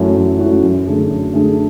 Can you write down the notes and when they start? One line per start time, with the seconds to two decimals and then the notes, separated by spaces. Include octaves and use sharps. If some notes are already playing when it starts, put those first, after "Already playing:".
Already playing: F#2 E3 A3 C#4 F#4
0.16 F#2
0.39 E3 A3 C#4 F#4
0.63 F#2
0.87 D3 A3 D4 G#4
1.09 F#2
1.33 D3 A3 D4 G#4